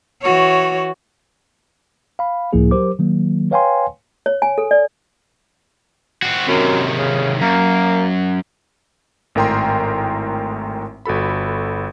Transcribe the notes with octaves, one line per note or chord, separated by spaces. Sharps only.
E3 F#4 C#5
F5 B5
C#2 A2 F3 A#3 E4 G#4
F#3 G4 A#4 C5 D6
D#3 F#3 A#3
B4 C#5 F5 G5 G#5 C6
C#5
G#5
A4
D5
C4 F#4
F#2 C3 D#3
C#3
F#2 A#3
G#1 A2 A#4 G5 A#5 C6
G1 F#4 A4 B5